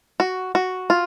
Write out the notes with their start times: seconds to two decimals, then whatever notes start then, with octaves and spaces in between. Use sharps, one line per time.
0.20 F#4
0.55 F#4
0.90 F4